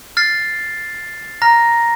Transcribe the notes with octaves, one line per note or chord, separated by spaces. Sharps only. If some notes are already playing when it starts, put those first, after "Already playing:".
F6 A6 C7
A#5 F6 A#6